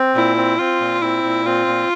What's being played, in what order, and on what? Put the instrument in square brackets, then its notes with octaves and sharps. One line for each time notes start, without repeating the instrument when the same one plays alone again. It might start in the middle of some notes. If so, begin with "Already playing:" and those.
Already playing: [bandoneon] C4
[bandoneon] A#2 [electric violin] E4
[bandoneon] C4
[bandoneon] C4 [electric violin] F4
[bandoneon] A#2
[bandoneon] C4 [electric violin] E4
[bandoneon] A#2
[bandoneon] C4 [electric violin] F4
[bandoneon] A#2